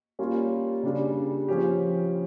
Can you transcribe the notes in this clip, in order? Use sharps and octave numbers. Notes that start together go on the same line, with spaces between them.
G3 A#3 C#4 F4
C#3 G3 D4
F3 C#4 G4